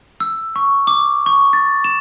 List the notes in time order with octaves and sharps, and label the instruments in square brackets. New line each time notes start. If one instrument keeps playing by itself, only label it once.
[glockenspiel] E6
C#6
D6
C#6
A6
E7